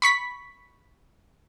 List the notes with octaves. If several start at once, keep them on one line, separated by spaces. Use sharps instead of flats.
B5 C#6 B6